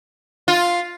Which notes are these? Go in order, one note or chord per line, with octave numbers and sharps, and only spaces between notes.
F4